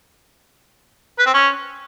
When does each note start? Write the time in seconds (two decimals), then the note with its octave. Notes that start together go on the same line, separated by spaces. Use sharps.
1.19 B4
1.26 C4
1.34 C#4